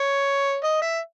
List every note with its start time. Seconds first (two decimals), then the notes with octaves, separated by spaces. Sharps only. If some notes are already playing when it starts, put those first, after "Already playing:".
Already playing: C#5
0.64 D#5
0.82 E5